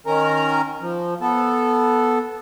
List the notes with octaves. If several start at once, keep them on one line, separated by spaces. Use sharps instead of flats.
D#3 C#4 A#4 A#5
F3
B3 A4